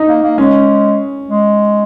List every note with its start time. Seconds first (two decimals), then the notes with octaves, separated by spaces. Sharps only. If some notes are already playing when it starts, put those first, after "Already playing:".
Already playing: D#4
0.08 A#3
0.23 A#3
0.38 G#3 C#4
1.28 G#3